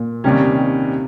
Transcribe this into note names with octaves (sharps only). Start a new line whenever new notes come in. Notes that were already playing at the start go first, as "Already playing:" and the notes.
Already playing: A#2
D#2 C3 D#3 G3 C#4